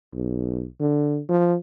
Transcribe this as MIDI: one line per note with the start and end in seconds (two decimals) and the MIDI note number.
0.14 0.65 35
0.80 1.20 50
1.29 1.56 53